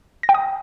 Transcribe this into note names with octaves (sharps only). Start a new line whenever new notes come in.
A#6
G5
D#6